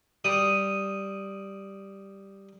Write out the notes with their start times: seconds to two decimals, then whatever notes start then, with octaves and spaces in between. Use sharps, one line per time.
0.24 G3 D#6